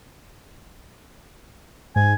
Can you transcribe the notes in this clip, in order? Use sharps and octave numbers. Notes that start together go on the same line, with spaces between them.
G#2 G#5